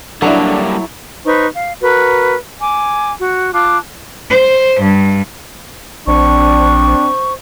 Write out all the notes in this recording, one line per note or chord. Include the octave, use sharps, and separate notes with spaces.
F#3 G3 A#3 D4 E4 A4
D#4 B4 C5 C#6
F5
F#4 A#4 B4
G#5 D6
F#4
F4 A5 D6 F#6
C5
G2
A#1 C4 D4 C5 C#6